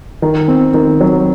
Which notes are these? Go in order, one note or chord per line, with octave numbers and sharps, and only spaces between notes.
D#3
C4
D#3
F#3